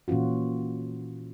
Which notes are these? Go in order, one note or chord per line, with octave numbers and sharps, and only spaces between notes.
A#2 E3 C#4 F4 F#4